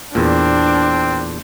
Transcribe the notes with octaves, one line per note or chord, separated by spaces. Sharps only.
E2 A#2 C4 D4